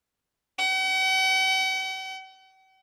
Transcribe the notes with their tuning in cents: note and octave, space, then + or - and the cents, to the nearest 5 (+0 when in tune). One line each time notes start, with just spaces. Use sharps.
F#5 +45